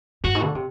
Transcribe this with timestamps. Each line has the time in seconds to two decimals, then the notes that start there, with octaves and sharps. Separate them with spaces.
0.24 G2 F#4
0.35 G#2
0.44 D3
0.55 C3